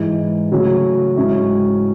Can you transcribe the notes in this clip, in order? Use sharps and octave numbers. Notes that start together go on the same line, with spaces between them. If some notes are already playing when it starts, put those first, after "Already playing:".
Already playing: G#2 E3 G#3
C#3 F#3 A3 C#4
G#2 F#3 C#4 E4